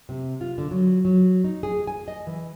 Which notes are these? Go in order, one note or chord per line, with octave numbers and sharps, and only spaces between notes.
C3
F4
D3
F#3
F#3
D#4
G#4
G#5
D#5
E3